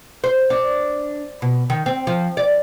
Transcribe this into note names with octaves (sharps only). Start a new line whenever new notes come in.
C5
D4
B2
D#3
C4
F3
D5